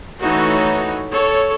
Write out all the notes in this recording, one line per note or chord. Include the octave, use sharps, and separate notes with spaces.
E3 A3 D#4 F#4 C#5
A4 C#5